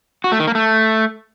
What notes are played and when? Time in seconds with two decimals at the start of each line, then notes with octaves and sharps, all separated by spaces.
0.24 F#4
0.32 A3
0.40 D#3
0.47 A#3
0.55 A3